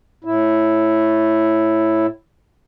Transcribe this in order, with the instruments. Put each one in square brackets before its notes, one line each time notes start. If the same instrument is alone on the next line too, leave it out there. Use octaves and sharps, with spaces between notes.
[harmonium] A2 E4